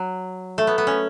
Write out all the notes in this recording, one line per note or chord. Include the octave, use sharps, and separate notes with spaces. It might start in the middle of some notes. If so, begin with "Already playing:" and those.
Already playing: F#3
A3
B3
B3
C#4